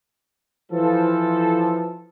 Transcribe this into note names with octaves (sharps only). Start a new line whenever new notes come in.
E3 F3 A4